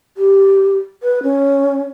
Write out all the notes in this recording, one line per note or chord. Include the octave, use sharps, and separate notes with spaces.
G4
B4
C#4